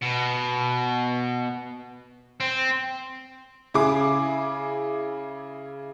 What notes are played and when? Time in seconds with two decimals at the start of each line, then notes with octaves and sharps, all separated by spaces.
0.02 B2
2.40 C4
3.74 C#3 E4 G#4 D6